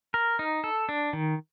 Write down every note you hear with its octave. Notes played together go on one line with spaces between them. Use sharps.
A#4
D#4
A4
D4
D#3